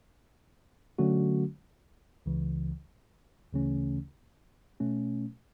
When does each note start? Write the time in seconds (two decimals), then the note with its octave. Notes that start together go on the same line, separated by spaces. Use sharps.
0.98 D3 F#3 A3 C#4 F#4
2.26 C#2 C#3 E3
3.53 D2 C#3 E3 A3 C#4
4.80 B2 A3 C#4